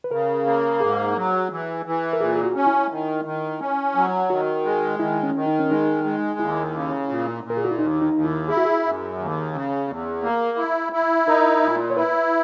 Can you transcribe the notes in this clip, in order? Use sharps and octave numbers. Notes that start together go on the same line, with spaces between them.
B4
C#3 A#4
A#3
G#2 G#4
F#3
E3
E3
A#4
A#2 G#4
G#4
F#4
C#4
E4
D#3
D#3
C#4
F#3
D#3 F#4
G#3
D#3 E4
C#4
D#3
D#4
C#4
G#3 D#4
G#3
D#2 E4
C#3
A#2
A#2
A#4
G#4
F#4
E4
D#2 D#4
D#4
D#2
E4
E4 G#4
F#4
G#4
F#2
D#2
C#3
E2
A#3
E4
E4
D#4 A#4
A#2
C#5
E4 B4